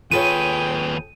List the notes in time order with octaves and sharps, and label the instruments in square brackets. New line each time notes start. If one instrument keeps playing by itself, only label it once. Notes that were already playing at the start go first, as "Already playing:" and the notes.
[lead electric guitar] D#2 B4 [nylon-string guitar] F4 A4 C#5 [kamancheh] G#4 G5 [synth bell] D#7